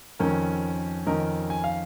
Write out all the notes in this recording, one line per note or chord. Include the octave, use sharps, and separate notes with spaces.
F2 D#3 C#4 A#4
F2 D#3 C#4 A#4 D#5
G#5
F5